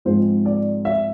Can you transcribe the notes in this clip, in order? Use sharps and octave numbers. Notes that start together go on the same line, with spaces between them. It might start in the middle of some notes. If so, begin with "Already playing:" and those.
G#2 F3 G#3 C4 C5
D5
E5